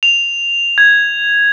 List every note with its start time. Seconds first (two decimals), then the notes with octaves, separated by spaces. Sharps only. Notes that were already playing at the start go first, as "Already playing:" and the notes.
0.03 F7
0.78 G#6